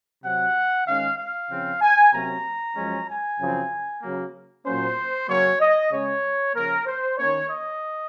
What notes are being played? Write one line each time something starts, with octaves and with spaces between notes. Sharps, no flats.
C3 F#3 C4 F#5
D#3 G#3 C#4 F5
F5
C#3 F3 C4
G#5
C3 F#3 A#3 C#4 A#5
F#2 F3 G#3 C#4
G#5
F#2 C#3 F3 C4
C#3 F#3 A#3
A#2 F#3 A#3 C#4 C5
C#3 F#3 A#3 C#4 C#5
D#5
C#3 G#3 C#4 C#5
C#3 F3 A#3 A#4
C5
D#3 A#3 C#4 C#5
D#5